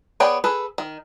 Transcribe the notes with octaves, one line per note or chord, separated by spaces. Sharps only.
B3 G#4 C#5 D5 G5
G#4 A4 B4
D#3